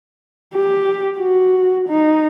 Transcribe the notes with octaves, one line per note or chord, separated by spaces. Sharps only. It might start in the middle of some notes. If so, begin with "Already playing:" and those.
G4
F#4
D#4